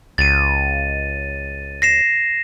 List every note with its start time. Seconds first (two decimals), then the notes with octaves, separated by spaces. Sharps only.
0.18 C#2 A6 D#7
1.82 A#6 C7 E7